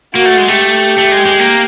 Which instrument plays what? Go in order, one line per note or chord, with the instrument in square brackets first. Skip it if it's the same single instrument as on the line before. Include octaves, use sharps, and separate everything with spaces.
[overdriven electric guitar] A#3 [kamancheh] F#4
[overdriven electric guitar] A3
G#3
A3
[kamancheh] G4
[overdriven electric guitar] A3
G#3
G#3
A#3